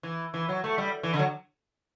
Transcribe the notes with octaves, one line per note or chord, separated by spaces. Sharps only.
E3
E3
F#3
A3
G3
E3
D3
F#3